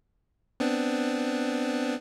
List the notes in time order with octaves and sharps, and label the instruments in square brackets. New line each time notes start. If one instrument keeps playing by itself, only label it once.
[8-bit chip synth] B3 C4 D4